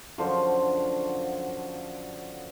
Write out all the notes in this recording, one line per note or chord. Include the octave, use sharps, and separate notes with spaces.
F#2 D3 F3 C5